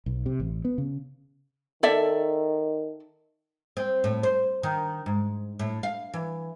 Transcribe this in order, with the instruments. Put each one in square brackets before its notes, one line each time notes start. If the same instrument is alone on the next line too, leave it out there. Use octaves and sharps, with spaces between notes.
[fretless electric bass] B1
C3
A1
B3
C#3
[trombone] D#3 [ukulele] A4 D5 E5
[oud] C4
A2
C5
D#3
G#2
A2
F5
E3